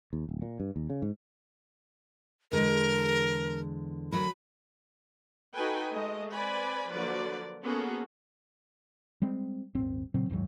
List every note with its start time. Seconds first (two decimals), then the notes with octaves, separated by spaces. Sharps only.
0.13 D#2
0.29 D1
0.42 A#2
0.60 G2
0.76 D#2
0.90 C#3
1.02 G#2
2.52 E2 D3 G#3 A#4
4.12 D2 F#3 A#4 B5
5.54 D#4 F#4 A4 B4 G5 G#5
5.93 G#3 A3 D#5
6.33 C4 B4 D5 G#5 B5
6.90 D3 F3 F#3 A#3 B4 D5
7.63 A#3 B3 C#4 F#4 G#4 A4
9.22 G3 G#3 C4
9.75 D#1 G#1 C4
10.14 A#2 C#3 F#3 C4
10.29 F#1 D#2 G#2 F#3